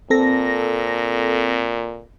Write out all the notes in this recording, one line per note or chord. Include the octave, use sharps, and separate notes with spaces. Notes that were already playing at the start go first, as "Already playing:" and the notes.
A#2 C4 A4 A#6